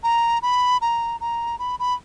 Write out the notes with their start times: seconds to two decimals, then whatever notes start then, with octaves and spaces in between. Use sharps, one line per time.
0.03 A#5
0.42 B5
0.81 A#5
1.21 A#5
1.59 B5
1.80 B5